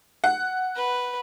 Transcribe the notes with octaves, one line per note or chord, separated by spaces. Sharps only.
F#5
B4